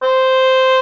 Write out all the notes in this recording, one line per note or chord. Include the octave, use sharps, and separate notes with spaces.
C5